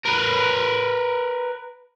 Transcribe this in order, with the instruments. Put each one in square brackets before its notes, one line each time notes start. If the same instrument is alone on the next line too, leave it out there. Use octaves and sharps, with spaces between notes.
[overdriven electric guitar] A#4 B4